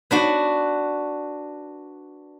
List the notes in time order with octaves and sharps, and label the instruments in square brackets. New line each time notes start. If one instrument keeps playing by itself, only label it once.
[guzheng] B3 D4 F#4